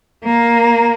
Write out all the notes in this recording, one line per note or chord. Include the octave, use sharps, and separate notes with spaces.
A#3